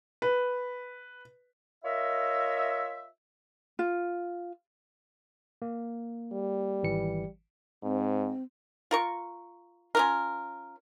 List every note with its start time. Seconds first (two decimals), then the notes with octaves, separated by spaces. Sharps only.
0.22 B4
1.84 F4 A#4 C#5 D#5 E5
3.79 F4
5.62 A#3
6.33 G3
6.83 G#1 E3 C#7
7.84 G#2 C4
8.91 F4 A#4 C#6
9.95 C#4 F4 A#4